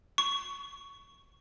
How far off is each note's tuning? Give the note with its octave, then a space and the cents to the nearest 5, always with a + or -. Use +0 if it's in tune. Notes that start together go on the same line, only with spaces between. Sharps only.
C#6 +15